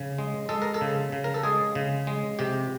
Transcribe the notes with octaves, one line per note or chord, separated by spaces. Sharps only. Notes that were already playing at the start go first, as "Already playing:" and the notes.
Already playing: C#3
G#3
G#3 A4
A#4
A4
C#3
C#3
A#4
A4
G#3 G#4
C#3
G#3
C3 G4